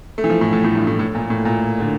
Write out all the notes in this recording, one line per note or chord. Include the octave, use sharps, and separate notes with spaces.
A3
E3
F3
A2
A2
A2
G2
A2
A2
A#2
A2
A#2
D3